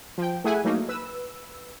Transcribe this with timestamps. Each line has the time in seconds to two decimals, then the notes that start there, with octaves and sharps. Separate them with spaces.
0.18 F3 G5
0.44 A3 E4 G#4 E5 F#5 G#5
0.64 F#3 A3 A#3 D#4
0.89 B4 E6